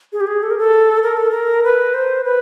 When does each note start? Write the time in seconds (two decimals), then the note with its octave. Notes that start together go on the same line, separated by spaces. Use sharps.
0.13 G#4
0.21 G4
0.27 G#4
0.43 A4
0.51 A#4
0.58 A4
1.03 A#4
1.17 A4
1.31 A#4
1.64 B4
1.94 C5
2.25 B4